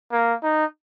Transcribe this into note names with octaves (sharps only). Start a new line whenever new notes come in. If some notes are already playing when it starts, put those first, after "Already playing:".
A#3
D#4